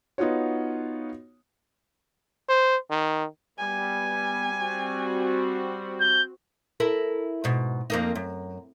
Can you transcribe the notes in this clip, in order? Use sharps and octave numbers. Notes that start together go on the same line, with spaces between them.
B3 D#4 F4 F#4 C#5
C5
D#3
G3 B3 G#5
C4 F#4
G6
E4 A4 A#4
G#2 B2
F2 A#3 D#4
F#2